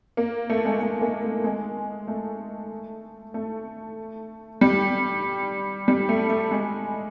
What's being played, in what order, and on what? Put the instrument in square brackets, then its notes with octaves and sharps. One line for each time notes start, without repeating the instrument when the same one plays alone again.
[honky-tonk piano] A#3
A3
G#3
A3
A#3
A3
G#3
A3
A3
G3
G3
A3
A3
G#3